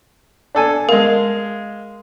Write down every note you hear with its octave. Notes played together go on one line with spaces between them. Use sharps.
D4 A4 G#5
G#3 A#4 F5